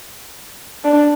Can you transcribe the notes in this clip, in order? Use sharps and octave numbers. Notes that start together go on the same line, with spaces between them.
D4